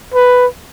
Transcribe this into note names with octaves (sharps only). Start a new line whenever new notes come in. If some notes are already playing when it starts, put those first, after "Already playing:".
B4